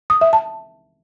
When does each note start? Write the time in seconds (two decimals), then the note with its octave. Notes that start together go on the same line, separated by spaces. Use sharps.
0.10 D#6
0.21 E5
0.33 A5